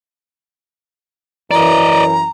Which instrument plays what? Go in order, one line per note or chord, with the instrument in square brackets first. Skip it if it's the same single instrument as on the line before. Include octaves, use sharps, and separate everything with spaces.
[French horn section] F#2 E3 [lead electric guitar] D5 D#5 [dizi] A#5